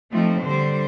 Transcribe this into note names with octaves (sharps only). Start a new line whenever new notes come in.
F3 A3 C4 D#4
D3 G3 C5